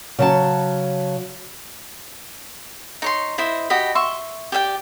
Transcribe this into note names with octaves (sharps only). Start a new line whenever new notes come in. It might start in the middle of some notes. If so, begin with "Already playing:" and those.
C#3 F#3 A5
D#4 C#5 C6
E4 C5 D#5
F#4 G4 D#5 B5
E5 C6 C#6
G4 D5 F5 G5